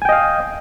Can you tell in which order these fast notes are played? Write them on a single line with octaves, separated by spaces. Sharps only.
G#5 G5 D#5 F5